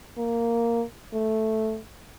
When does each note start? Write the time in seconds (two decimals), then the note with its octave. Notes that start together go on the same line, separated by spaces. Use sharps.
0.18 A#3
1.13 A3